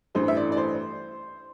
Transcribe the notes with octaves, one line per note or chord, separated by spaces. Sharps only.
A1 G2 E3 A3 C5
E5
D5
D5
C5